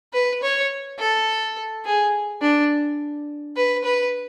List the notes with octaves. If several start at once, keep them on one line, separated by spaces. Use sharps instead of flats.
B4
C#5
A4
G#4
D4
B4
B4